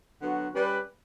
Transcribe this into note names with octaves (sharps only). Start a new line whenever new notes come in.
D3 F#3 B3 F#4
G3 C#4 G4 B4